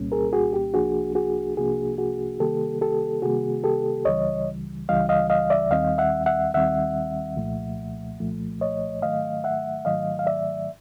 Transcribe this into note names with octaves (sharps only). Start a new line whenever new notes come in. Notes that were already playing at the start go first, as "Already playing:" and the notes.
Already playing: C2 A#2 G3 A#3 C#4
G#4 A#4
F#4 G#4
G4
C2 C3 F3 A#3 D4 F#4 G#4
F#4 G#4
C2 C3 F3 A#3 D4 F#4 G#4
F#4 G#4
C3 D#3 G3 A#3 G4 A4
G4 A4
C3 D#3 G3 A#3 F#4 G#4
G4 A4
C#2 C#3 E3 G3 C#5 D#5
C#2 C#3 E3 G3 D#5 F5
D#5 F5
D#5 F5
D5 E5
D#2 D#3 G3 C4 D#5 F5
E5 F#5
E5 F#5
D#2 D#3 G3 C4 E5 F#5
C2 A#2 F3 A3
C2 A#2 F3 A3
C#5 D#5
G#2 D#3 F#3 A3 D#5 F5
E5 F#5
G#2 D#3 F#3 A3 D#5 F5
F5
D5 E5